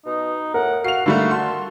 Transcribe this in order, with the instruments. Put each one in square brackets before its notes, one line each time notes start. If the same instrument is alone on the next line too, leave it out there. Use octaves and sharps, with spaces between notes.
[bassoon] B2 [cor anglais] D#4
[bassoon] A2 [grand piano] A#4 [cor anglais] F#5
[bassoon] F#4 [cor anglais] F5 [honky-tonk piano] C7 F7
[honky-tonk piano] D3 G3 A3 [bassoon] A#3 [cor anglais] F#4
[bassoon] F#4 [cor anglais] A4 [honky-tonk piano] C6